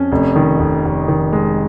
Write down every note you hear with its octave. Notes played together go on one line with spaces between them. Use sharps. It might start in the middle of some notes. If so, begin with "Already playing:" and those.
Already playing: F2 C#4
F1
D#3
F1
F1
D#3
G#3